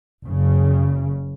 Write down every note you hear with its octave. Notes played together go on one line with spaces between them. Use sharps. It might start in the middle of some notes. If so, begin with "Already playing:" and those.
F#1 C#3